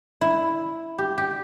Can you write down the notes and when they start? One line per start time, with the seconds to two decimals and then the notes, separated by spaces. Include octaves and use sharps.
0.21 E4
0.98 G4
1.18 G4